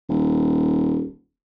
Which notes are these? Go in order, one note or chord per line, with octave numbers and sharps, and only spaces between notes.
D#1